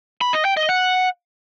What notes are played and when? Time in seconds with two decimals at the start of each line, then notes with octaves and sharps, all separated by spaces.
0.21 B5
0.33 D#5
0.45 G5
0.57 D#5
0.69 F#5